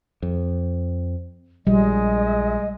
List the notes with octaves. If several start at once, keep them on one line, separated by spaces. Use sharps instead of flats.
F2
A#1 G3 G#3 D#5